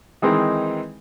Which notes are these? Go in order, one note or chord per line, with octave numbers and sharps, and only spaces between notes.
D#3 E3 G#3 C4 D#4